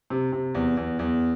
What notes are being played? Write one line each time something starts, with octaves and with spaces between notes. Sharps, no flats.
C3
C3
E2
E2
E2